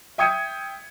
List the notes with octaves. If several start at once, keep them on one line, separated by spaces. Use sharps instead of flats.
E5 G5 D#6 G#6 C#7 D#7